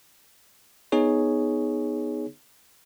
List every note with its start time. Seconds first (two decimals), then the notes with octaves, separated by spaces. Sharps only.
0.92 B3 D#4 G#4 C#5